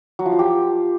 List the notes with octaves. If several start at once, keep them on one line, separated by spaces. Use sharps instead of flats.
F#3
F3
F4
G4